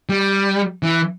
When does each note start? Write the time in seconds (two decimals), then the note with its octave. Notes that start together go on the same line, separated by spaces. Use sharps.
0.09 G3
0.83 E3